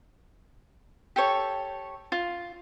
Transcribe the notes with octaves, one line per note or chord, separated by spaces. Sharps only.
G4 A4 C#5
F4